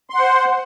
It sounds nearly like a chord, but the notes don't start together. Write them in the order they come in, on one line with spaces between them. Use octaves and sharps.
C6 F#5 C5